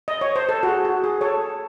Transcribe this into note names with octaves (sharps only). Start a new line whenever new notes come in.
D#5
C#5
C5
A4
F#4
G#4
F#4
G#4
A4 C#5